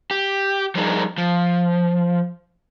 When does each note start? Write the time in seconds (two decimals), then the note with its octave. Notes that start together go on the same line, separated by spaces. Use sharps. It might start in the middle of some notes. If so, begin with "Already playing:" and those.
0.11 G4
0.75 F3 G3 D4 D#4 G#4 A#4
1.18 F3